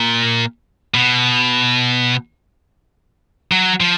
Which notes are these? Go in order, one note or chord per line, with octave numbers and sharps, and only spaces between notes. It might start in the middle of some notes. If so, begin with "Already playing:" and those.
Already playing: A#2
B2
F#3
F3